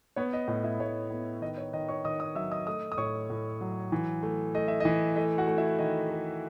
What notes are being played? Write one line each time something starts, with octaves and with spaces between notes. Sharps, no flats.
B3 C#5
D#5
A2 D#5
E4 E5
A2 C#5
B3
D#3 D#5
C#5
D#3 D#5
C#5 C#6
D#3 D#5 D#6
D#5 D#6
F#3 E5 E6
D#5 D#6
A3 D#5 D#6
D#6
A2 C#5 C#6
A2
F#3
E3
A3
A3 D#5
E5
E3 D#5
A3 D#5
F#4 F#5
A3
E4 E5
D#3 D#5
A3